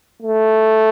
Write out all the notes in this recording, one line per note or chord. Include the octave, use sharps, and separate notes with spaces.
A3